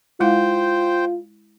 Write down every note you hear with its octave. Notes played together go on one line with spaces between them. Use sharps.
G#3 E4 F4 C5 F5 G5